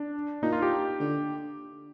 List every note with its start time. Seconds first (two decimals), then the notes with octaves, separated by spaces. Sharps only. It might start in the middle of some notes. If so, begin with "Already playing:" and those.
Already playing: D4
0.43 A#2 D#4
0.53 F4
0.62 G4
1.00 D3